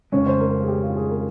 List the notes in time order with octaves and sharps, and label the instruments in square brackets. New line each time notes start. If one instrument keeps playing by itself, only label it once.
[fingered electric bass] F2 C#3 G#3 [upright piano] C#4
[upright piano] C5
A#4
G#4
G4
F4
G#4
A#4